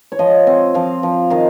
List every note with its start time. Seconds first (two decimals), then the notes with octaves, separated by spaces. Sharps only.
0.12 C#5
0.19 F3 D#5
0.47 C4
0.74 F3 F5
1.03 F3
1.30 D#3 F5